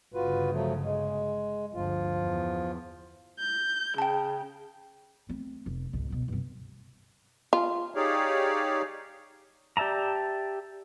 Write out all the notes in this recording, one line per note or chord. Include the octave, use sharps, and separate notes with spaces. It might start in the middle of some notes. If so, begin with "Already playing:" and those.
G1 C#3 F4 F#4 B4
F3 F#3 A3
G#3
G1 D2 F3 F4
E2
G6
C#3 G5 A5
A3 C4
F1
G#1 C#2
G1 B2
G2 C3
F4
D#4 G4 G#4 C#5 D5 F5
G4 D5 E5 A5 A#5